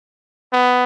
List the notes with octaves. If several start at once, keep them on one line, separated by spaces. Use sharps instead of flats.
B3